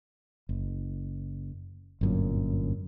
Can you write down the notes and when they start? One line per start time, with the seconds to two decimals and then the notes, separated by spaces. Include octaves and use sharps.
0.49 F#1
2.01 G1 F#2 A#2